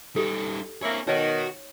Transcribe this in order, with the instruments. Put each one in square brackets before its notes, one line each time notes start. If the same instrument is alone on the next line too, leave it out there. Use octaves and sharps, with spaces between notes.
[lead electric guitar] G3 D#4 [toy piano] G4 A4
[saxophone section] A#3 E4 [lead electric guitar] C4 C#5
[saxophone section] B2 D#3 [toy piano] D#4 C#5 [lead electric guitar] F#4